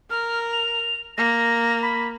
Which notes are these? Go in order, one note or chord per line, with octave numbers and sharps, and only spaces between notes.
A#4 F6
F7
A#3 A#6
B5